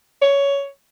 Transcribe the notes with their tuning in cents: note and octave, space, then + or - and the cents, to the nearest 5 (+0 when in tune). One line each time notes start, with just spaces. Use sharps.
C#5 +15